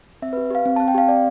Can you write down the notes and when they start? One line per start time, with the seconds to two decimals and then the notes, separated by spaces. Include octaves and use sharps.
0.22 C4 E5
0.33 B4
0.37 G4
0.51 G4 F5
0.65 C4
0.76 A5
0.80 C4
0.88 G5
0.95 G4 F5
1.09 C4 D5